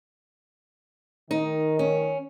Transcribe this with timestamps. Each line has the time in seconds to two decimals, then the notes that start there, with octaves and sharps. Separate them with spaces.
1.31 D#3 D#4
1.79 C#4